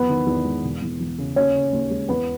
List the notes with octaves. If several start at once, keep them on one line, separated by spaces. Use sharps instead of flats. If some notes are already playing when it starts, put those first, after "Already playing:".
Already playing: E2 F#3 B3 B4
D#3
E2
G#3
E1
E2
E3
C#3
D#2 C#4 C#5
C#3
D#2
G#3
E2 B3 B4